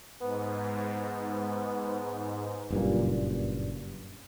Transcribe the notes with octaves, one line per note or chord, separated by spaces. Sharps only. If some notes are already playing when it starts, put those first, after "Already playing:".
G#2 B3
F#1 G2 A#2